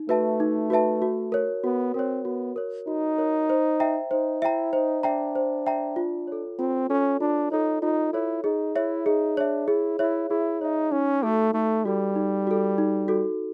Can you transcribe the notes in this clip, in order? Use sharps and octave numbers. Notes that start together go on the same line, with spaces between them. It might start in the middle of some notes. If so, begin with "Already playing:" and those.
Already playing: D#4
A3 F#4 B4 E5 A5
D#4
F#4 B4 E5 A5
F#4
A#4 C#5
B3 F#4
C4 A#4 C#5
B3 F#4
A#4 C#5
D#4 F#4
A#4 C#5
C5
E5 G5 A#5
D#4 C5
E4 E5 G5 A#5
D#4 C5
D4 E5 G5 A#5
C5
E5 G5 A#5
F4
A4 C#5
C4 F4
C#4 A4 C#5
D4 F4
D#4 A4 C#5
D#4 F4
E4 A4 C#5
D#4 G#4
E4 C#5 E5
D#4 G#4
D4 C#5 E5
E4 G#4
E4 C#5 E5
E4 G#4
D#4 C#5 E5
C#4 D#4
A3 F#4 A4
A3 D#4
G3 F#4 A4
D#4
F#4 A4
D#4
F#4 A4